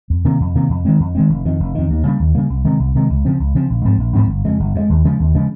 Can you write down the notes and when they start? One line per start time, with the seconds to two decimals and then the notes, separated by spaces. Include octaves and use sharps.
0.10 F2
0.25 C3 D#3 A#3
0.40 F2
0.55 C3 D#3 A#3
0.70 F2
0.85 D#3 G#3 C4
1.00 F2
1.15 D#3 G#3 C4
1.30 F1
1.45 F2 D#3
1.60 F1
1.75 F2 D#3
1.90 D#2
2.05 C#3 G3 A#3
2.20 D#2
2.35 C#3 G3 A#3
2.50 C2
2.65 C3 D#3 G#3
2.80 C2
2.95 C3 D#3 G#3
3.10 C#2
3.25 C#3 F3 C4
3.40 C#2
3.55 C#3 F3 C4
3.70 A#1
3.85 G#2 F3 C4
4.00 A#1
4.15 G#2 F3 C4
4.29 G1
4.45 F2 C#3 G#3
4.60 G1
4.75 F2 C#3 G#3
4.89 D#2
5.05 C#3 F3 G#3
5.20 D#2
5.35 C#3 F3 G#3